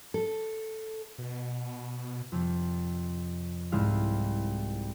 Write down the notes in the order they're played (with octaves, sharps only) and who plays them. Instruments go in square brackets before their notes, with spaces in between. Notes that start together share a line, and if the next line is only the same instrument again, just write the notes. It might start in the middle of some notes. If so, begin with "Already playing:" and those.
[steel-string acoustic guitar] A4
[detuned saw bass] B2
[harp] F2 C3
C2 G#2 G#3 E4 F5 E6